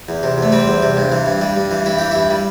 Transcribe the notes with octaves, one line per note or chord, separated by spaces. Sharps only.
E2
C3
E2 A3
G3 C4
E2
C3
G2
E3
G2
G3
G2
E3
G2 E4
E3 G4
G2 E4
G3